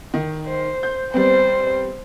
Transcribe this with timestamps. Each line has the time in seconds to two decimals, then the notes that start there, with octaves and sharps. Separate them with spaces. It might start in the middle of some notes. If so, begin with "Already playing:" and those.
0.14 D#3
0.47 C5
0.83 G6
1.14 G3 B3 C4 C5